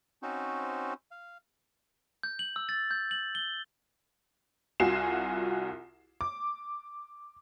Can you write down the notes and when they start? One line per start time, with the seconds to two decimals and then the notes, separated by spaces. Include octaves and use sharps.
0.22 C4 C#4 D#4 F#4 C5
1.11 F5
2.23 G6
2.39 F#7
2.56 E6
2.69 A6
2.91 G6
3.11 F#7
3.35 G7
4.80 C2 F4 F#4 G#5 C7 E7
6.21 D6